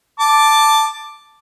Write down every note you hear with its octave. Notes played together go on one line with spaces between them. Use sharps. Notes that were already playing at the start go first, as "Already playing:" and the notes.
A5 D6